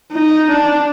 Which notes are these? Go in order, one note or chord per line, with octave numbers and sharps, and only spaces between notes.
D#4
D4